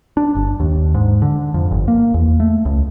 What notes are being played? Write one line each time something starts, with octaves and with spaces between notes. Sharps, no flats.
D4
G1
D#2
G#2
D3
F2
G1
A#3
E2
A3
C#2